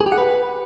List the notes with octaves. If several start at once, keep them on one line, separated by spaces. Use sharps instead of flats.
G#4
G4
F#5
B4